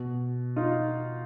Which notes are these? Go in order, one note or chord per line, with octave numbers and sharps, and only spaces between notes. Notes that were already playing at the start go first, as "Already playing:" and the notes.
Already playing: B2
D#4 F4